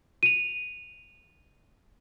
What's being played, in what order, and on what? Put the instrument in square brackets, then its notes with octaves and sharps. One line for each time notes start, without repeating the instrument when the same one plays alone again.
[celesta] D#7 F7